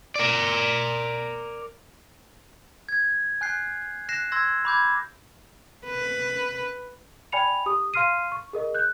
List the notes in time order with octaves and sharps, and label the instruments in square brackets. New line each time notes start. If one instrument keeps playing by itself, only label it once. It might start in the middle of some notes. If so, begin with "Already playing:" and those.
[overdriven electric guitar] A#4 D5
[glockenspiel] G#6
G#5 F#6 G6 C7
F#6 A#6 C7 E7
C6 E6 G#6 A#6
B5 D6 G6 G#6
[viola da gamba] B4
[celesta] D5 G5 G#5 B5 C#7 F7
G4 D#6
F5 C6 F6 C7 D#7
C#6
G#4 A#4 D#5
F#6 G6